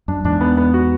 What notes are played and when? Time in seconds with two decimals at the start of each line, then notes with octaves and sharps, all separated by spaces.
0.08 F#2 D4
0.24 E2 G#2 D4
0.41 B3
0.57 B3
0.74 F#4